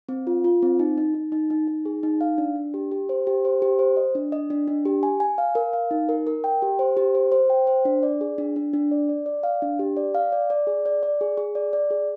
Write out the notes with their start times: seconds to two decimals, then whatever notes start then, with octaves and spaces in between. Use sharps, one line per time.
0.09 C4
0.27 F4
0.44 F4
0.62 C4
0.79 D#4
0.98 D#4
1.14 D#4
1.32 D#4
1.50 D#4
1.67 D#4
1.85 G#4
2.03 D#4
2.21 F5
2.38 D4
2.56 D4
2.74 G4
2.92 G4
3.09 C5
3.27 G4
3.45 C5
3.62 G4
3.79 C5
3.97 D#5
4.15 D4
4.32 D#5
4.50 D4
4.68 D4
4.85 G4
5.03 G#5
5.20 G#5
5.38 F5
5.55 A#4
5.73 F5
5.91 D#4
6.09 A#4
6.27 A#4
6.44 G5
6.62 G4
6.79 C5
6.97 G4
7.15 C5
7.32 C5
7.50 G5
7.67 C5
7.85 D4
8.03 D5
8.21 G#4
8.38 D4
8.56 D4
8.73 D4
8.91 D5
9.09 D5
9.26 D5
9.43 F5
9.62 D4
9.79 G4
9.97 D5
10.15 F5
10.32 D5
10.50 D5
10.67 G#4
10.86 D5
11.03 D5
11.21 G#4
11.37 G#4
11.55 D5
11.73 D5
11.91 G#4